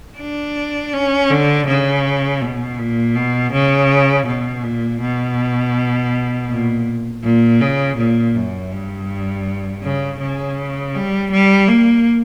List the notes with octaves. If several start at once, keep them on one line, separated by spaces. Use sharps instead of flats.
D4
C#4
D3
C#3
B2
A#2
B2
C#3
B2
A#2
B2
A#2
A#2
C#3
A#2
F#2
G2
C#3
C#3
G3
G3
A#3